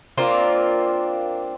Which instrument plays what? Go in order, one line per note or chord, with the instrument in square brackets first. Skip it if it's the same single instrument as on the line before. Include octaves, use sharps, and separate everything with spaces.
[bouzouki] A#3 C4 D4 F4